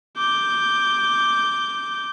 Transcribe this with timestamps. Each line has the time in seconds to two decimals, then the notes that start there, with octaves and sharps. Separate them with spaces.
0.17 D6 G6